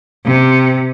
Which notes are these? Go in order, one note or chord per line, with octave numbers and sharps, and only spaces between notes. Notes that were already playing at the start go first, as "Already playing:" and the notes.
C3